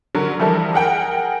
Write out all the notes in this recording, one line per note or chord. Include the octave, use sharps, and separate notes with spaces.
D3 F#3 A#4
E3 F3 G3 E4 A4 A#4
G#4 A#4 F#5 G5